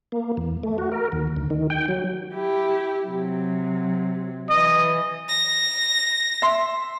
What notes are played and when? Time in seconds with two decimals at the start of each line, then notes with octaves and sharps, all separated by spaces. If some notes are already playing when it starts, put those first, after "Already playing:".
0.12 A#3
0.37 E2
0.63 A3
0.78 F#4
0.92 A#4
1.12 D#2
1.37 D2
1.50 D#3
1.70 G5
1.88 F#3
2.35 E4 G4
3.05 C3 F#3
4.49 E3 D#5
5.28 A#6
6.42 E5 C6